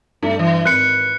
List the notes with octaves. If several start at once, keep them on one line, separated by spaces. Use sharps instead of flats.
G2 A3
E3
G#1 B4 F#6 C#7